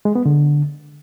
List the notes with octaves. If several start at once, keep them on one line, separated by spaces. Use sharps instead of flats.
G#3
B3
D3